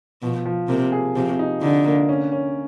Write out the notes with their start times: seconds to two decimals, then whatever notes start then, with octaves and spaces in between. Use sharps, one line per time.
0.22 B2 F3
0.45 F3
0.68 C3 A#3
0.92 G#4
1.16 C3 F3
1.39 D#4
1.62 D3 D#4
1.85 A#3
2.09 C#4
2.32 C#4